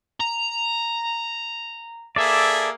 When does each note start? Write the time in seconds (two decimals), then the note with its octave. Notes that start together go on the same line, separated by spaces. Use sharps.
0.20 A#5
2.16 A#3 G#4 A4 D5 E5